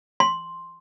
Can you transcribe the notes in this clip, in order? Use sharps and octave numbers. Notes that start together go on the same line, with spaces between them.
C6